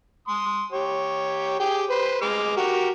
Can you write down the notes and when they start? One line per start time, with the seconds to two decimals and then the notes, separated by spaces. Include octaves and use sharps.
0.28 C6 D#6
0.72 G4 C#5
1.60 G4 G#4 G5
1.90 B4 C5
2.22 G#3 D6 F6
2.57 F#4 G4 A#4